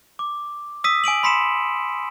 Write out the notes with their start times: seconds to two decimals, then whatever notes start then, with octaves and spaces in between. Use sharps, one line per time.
0.19 D6
0.84 D#6 E6 B6 D#7
1.04 G#5 D7 D#7 F#7
1.23 B5 C6 B6 C#7 E7